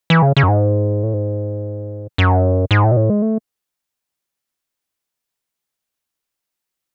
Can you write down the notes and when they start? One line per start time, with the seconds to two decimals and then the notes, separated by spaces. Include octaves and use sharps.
0.10 E3
0.22 C#3
0.37 C#3
0.43 F#2
0.48 G#2
1.03 A2
1.14 G#2
2.18 F#2
2.71 G#2
2.84 A2
2.92 B2
2.97 A2
3.10 G#3
3.22 A3